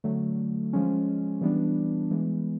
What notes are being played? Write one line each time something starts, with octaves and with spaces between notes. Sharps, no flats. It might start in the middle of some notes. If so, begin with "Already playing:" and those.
D3 F#3 A3
F3 G#3 C#4
E3 G3 B3 D4
E3 G#3 B3